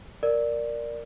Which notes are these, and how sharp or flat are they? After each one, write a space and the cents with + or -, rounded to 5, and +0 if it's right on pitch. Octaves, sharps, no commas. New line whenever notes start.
A#4 +0 D5 +0